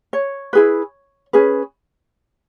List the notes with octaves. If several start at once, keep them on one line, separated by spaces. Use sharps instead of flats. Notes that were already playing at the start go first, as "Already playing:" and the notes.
C#5
E4 G#4 B4
C#4 G#4 B4